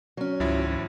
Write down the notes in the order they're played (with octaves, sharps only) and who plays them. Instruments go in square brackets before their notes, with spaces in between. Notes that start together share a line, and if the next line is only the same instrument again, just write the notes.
[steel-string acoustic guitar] F#3 C#4
[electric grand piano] G#1 F3 E4 [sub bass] C#2